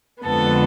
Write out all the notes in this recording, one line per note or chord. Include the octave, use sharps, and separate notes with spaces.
F2 D3 G#3 B3 A4